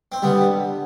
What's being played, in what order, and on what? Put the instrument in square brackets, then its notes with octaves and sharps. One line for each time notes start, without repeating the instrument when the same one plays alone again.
[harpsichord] C4
[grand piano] D3 [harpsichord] G3 B3